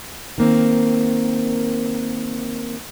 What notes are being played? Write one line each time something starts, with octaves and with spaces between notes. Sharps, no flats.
D#3 A#3 C4